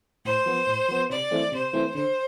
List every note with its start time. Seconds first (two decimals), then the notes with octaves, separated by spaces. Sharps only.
0.24 A2 C5
0.46 F3 B3
0.67 A2
0.88 F3 B3
1.10 C3 D5
1.31 E3 A3 C4
1.52 C3 C5
1.73 E3 A3 C4
1.94 D3 C5